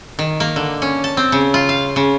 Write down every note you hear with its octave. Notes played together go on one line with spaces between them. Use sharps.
D#3
A#3
D3
C#4
A5
C4
C#3
F4
F5
C#3